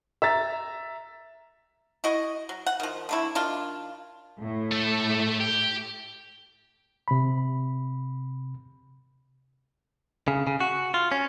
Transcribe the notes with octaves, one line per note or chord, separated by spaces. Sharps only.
E5 A#5 A6
E4 F#4 D#5
F#3
F#5
D#3 F3
D3 A3 E4
D#3 D4 F4
A2
A3 A4
G4
C3 B5
C#3
C#3
F#4
F4
C#4